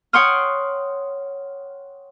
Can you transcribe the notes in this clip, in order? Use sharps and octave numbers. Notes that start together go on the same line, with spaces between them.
C#5 F#5 G5 C6 D#6 F6